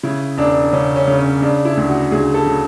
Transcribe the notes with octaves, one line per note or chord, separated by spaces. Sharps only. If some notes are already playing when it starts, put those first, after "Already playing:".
C#3 E4
E1 D4
C#3 C#4
C#4
C#3
C#4
C#3 D4
E4
D2
F#4
D2 G#4
A4
C#3